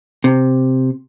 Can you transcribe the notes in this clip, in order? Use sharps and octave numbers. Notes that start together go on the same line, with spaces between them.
C3